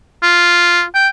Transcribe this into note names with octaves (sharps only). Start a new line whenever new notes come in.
F4
G5